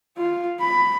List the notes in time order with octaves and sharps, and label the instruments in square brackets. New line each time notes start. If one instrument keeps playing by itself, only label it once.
[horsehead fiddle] F4
B5